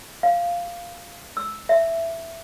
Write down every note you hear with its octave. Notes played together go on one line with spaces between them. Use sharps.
F5
E6
E5